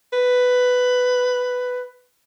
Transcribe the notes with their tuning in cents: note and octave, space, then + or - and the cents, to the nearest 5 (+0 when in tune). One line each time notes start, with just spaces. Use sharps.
B4 +10